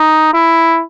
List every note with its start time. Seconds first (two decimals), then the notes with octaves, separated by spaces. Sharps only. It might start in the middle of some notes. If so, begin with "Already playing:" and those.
Already playing: D#4
0.34 E4